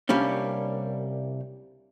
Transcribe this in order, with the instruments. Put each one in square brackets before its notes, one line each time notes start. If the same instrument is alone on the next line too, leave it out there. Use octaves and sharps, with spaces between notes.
[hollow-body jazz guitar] C2 G3 A#3 C#4 D4